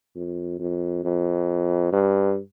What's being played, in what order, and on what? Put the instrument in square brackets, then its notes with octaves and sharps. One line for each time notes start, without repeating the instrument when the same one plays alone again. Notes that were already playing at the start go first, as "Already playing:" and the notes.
[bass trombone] F2
F2
F2
G2